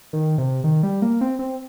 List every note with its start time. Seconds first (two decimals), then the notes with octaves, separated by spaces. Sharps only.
0.13 D#3
0.38 C3
0.64 D#3
0.83 G3
1.02 A#3
1.21 C4
1.39 C4